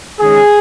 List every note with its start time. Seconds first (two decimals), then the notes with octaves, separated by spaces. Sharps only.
0.20 D#3 G#3 C#4 G#4